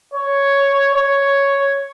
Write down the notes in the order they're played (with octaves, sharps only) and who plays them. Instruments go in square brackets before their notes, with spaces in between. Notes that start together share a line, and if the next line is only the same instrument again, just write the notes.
[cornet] C#5
C#5